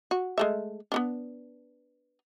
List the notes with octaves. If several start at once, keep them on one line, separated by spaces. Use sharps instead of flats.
F#4
G#3 A3 E5
B3 C#4 D4